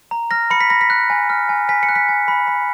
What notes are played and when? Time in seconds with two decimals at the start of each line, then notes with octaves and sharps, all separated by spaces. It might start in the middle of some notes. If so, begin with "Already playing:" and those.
0.11 A#5
0.31 F6 A#6
0.50 B5 C#7
0.60 B6
0.70 B5 A#6
0.81 B6
0.90 F#6
1.10 G#5
1.30 F6
1.49 G#5
1.69 G#5 B6
1.83 C#7
1.89 F#6
1.95 B6
2.09 G#5
2.28 B5
2.48 B5